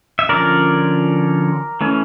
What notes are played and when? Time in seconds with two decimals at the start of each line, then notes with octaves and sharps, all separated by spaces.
0.19 E5
0.29 D3 F3 C#4 A#4 D5
1.81 E3 A3 C#4